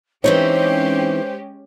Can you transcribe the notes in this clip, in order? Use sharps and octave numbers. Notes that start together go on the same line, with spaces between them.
E3 G#3 C4 C#4 D#4 G4 C5 C#5